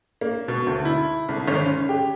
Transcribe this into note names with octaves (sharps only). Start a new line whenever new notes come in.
A#3
B2
D2
E4
C2
G#1
C#4
G4